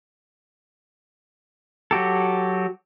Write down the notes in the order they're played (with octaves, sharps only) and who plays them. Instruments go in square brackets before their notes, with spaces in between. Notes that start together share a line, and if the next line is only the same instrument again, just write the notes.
[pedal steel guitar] F#3 F#4 G4 A4